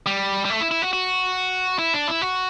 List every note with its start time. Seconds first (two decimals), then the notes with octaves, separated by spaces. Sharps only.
0.06 G3
0.45 G3
0.50 A3
0.61 E4
0.71 E4
0.82 F#4
0.93 F#4
1.79 E4
1.94 D4
2.08 E4
2.22 F#4